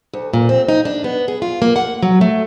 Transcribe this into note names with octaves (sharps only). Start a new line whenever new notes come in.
D2
A#2
C4
D#4
D4
B3
G#4
F4
A#3
F#5
F#3
A3